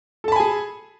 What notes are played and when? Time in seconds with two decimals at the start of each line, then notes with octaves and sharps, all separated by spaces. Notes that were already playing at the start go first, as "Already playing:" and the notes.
0.24 A4
0.28 A5
0.32 B5
0.36 G#5
0.40 G#4